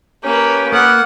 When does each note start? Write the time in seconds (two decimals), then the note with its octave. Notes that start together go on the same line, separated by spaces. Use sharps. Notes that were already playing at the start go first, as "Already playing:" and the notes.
0.24 A#3 C#4 G4 B4 C#5
0.72 A#3 B3 F#5